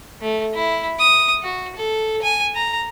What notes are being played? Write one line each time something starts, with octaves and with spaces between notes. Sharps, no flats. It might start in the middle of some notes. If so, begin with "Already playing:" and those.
A3
E4
D#6
F#4
A4
G#5
A#5